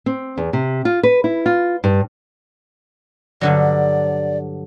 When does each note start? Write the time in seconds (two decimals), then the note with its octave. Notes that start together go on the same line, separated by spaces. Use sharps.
0.06 C4
0.38 E2
0.53 C3
0.85 F4
1.03 B4
1.24 E4
1.46 F4
1.84 G2
3.41 G2 D3 F#3 D5